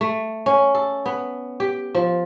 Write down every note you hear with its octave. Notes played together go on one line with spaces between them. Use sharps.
A3
C#4
A4
B3
G4
F3